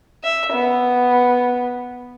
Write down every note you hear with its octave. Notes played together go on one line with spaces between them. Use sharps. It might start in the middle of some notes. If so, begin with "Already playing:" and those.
E5
B3